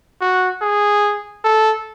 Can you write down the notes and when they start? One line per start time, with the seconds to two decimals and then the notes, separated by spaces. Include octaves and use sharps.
0.21 F#4
0.61 G#4
1.44 A4